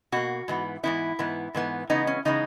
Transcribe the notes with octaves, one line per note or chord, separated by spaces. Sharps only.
B2 A#3 F#4
G#2 E3 B3
G#2 E3 B3 E4
G#2 E3 B3
G#2 E3 B3
C#3 E3 G#3 B3 D#4
C#4
C#3 E3 G#3 B3 D#4